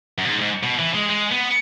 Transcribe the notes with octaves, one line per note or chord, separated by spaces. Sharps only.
F#2
B2
G#2
G#2
B2
E3
G#3
G#3
B3